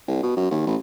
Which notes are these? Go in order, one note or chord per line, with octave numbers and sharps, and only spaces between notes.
C2
B2
F#2
D#2
A1